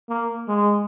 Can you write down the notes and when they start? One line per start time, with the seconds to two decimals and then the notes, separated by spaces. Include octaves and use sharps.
0.09 A#3
0.48 G#3